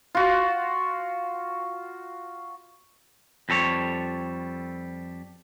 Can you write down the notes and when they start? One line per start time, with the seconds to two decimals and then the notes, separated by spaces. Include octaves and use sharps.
0.15 F4 F#4
3.49 F2 G3 A4 C#5